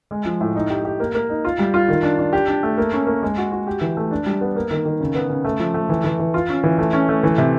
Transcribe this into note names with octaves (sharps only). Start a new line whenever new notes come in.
G#3
F3
A2
D#4
G4
G4
A#3
A#3
D#4
F4
G3
F4
D#3
D4
D4
G4
D4
A3
A#3
C#4
A#3
G#3
F#4
F#4
G4
E3
A3
D4
G3
B3
A#3
D#3
D#3
C#3
B3
C#3
A3
F3
A3
E3
E3
E3
F4
C#4
E3
A3
C#4
A3
E3
C3